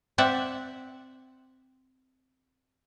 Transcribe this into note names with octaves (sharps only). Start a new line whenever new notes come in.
C4 D5 E5 F#5